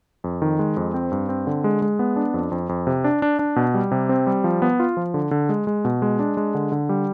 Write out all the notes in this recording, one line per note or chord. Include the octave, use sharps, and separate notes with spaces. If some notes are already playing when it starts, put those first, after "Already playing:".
F2
D#3
G#3
F2
C4
G2
C4
D3
G#3
G#3
B3
D4
F2
F2
F2
C3
D4
D4
D4
B2
G3
C3
C4
G3
F3
B3
F4
F3
D3
D3
G#3
G#3
B2
G#3
D4
G#3
D3
D3
G3